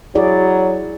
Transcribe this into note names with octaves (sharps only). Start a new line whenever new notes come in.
F#3 E4 G#4 D5